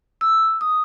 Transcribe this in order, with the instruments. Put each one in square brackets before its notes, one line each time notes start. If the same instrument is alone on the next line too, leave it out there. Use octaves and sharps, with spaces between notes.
[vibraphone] E6
D#6